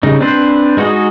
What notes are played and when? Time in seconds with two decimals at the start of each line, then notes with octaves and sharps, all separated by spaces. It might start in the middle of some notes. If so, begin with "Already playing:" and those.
0.03 C#3 G3 D#4
0.20 C4 D4 B4 C5
0.77 G#3 D#4 F#4 G#4 D#5